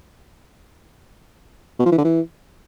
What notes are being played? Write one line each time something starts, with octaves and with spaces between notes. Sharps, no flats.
B2
F3
E3
D3
E3